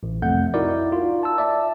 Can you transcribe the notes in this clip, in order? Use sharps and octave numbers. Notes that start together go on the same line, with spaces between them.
A1
C2 F2 A3 F#5 G6
D#4 E4 F#4 A#4 D5
F4
A5 E6
D5 E5 A5